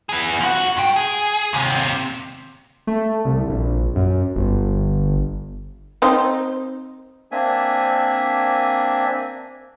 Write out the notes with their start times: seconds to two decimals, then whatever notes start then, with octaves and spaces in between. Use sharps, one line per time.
0.09 B3 G#4
0.41 F3 F#4
0.77 G2 G5
0.96 G#4
1.53 D#2 C3
2.87 A3
3.25 C2
3.48 A#1
3.95 F#2
4.36 G1
6.02 C4 D#4 C5
7.32 A#3 C4 D4 E5 G#5